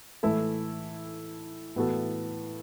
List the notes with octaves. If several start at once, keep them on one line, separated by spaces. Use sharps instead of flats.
A2 E3 A3 E4 A4
A2 E3 B3 F#4 A4